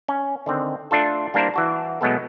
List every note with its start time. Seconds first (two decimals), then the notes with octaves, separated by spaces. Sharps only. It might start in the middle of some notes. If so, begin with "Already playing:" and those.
0.08 C#4
0.46 D3 D#3 C4
0.91 A3 D4 F4 A4
1.34 G3 A#3 D4 E4 A#4 C5
1.54 E3 F#4 A5
2.01 B2 F#3 G#3 A3 B3 A4